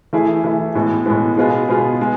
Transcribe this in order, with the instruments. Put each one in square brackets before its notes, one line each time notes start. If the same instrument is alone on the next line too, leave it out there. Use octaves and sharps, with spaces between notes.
[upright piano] E3 A3 E4 G#4
E3 A3 E4 G#4
A2 G#3 B3
A2 G#3 B3
B2 G#3 B3 F4 G#4
B2 G#3 B3 F4 G#4
G#3